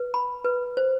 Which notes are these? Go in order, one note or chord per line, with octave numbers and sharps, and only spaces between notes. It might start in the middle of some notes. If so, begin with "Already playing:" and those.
Already playing: B4
B5
B4
C5